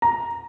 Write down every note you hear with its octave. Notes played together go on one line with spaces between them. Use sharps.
A#5